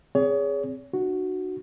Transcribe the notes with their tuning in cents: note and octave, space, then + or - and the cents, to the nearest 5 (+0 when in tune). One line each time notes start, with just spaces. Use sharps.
C4 +0 G#4 -10 C#5 +35
D4 +45 F#4 +0